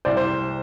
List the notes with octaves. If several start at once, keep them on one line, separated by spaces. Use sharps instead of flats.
C2 C5 D5
C5